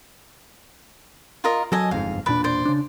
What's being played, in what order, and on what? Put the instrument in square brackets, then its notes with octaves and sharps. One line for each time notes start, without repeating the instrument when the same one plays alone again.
[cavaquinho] F4 A#4 D#5
[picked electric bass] F#3 [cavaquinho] A4 D#5 G#5
[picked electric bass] G1 F2 G#2 [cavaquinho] F5
[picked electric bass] E1 A#2 D4 [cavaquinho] B4 D5
[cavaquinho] C5 D5
[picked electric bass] C#3 D4